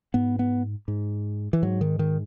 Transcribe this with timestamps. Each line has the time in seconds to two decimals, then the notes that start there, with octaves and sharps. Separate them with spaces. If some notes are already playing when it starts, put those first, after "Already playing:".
0.14 G#2 B3
0.39 B3
0.88 G#2
1.53 E3
1.62 G#2 F#3
1.81 D#3
1.99 D#3